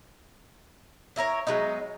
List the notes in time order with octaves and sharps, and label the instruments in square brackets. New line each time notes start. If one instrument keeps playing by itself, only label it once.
[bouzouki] D4 E4 A#4 C#5
F#3 G#3 B3 D#4